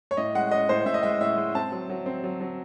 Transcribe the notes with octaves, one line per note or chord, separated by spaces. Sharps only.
C#5
A2 D#5
G#3 F#5
C#4 D#5
A2 C5
A2 E5
D#5
G#3 E5
A2 E5
G#3
C4 A5
F#3
F#3
C4
F#3
F#3